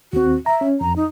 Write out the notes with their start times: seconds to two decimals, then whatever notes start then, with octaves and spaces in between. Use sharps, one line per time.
0.13 D#2 C4 F#4
0.46 E5 A#5
0.61 C#4
0.81 F2 A#5
0.96 D#4